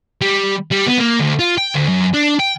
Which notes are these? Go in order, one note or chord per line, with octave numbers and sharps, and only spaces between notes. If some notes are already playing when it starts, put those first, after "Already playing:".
G3
G3
B3
A#3
D2
F4
G5
D2
F#2
D4
G5